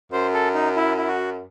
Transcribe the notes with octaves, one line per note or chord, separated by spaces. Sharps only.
F#2 C5
A4
D#4
E4
E4
F#4